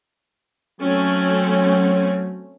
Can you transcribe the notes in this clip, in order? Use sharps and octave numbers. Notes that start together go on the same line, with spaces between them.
F#3 A3 C4 C#4